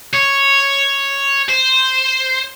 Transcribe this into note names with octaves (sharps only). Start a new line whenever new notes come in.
C#5
C5